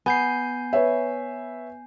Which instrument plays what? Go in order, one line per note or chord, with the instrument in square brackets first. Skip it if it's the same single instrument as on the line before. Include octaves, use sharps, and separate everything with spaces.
[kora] B3 [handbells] G#5 G6 C7
[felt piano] B4 C#5 E5